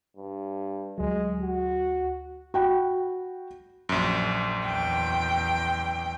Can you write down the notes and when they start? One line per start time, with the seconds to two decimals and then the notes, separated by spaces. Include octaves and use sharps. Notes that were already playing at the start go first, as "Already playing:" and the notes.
0.16 G2
0.98 D2 F#3 G#3
1.42 F#4
2.54 F#4 G5 B5
3.89 A#1 F#2
4.66 E2 G5